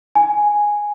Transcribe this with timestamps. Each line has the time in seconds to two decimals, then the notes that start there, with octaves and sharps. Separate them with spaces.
0.15 G#5